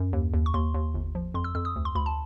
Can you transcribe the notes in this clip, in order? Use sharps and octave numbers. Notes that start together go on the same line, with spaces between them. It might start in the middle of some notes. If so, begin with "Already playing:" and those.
Already playing: F#2
D#2
D#2
C#6
D#2 C6
D#2
G1
F3
F2 C6
E6
F2 E6
D#6
D2
C6
D2 B5
A5